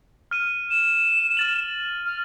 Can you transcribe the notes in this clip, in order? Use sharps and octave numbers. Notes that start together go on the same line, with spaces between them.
F6 D#7
E7
F6 A6 F#7
F6